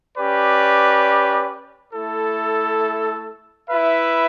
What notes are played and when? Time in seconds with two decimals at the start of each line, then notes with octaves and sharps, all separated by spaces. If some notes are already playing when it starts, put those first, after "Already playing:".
0.17 C#4 G4 B4 D5
1.94 A3 E4 A4
3.69 E4 B4 E5